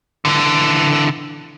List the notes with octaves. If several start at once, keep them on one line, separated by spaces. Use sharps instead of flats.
D3 E3